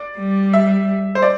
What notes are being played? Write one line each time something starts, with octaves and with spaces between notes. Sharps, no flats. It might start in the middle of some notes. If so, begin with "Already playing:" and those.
Already playing: D5
G3
E5
C5
D5